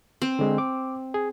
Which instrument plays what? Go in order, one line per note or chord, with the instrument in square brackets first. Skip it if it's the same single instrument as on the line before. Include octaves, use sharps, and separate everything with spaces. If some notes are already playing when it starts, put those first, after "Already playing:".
[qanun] C4
[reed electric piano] D3 G#3
D6
G#4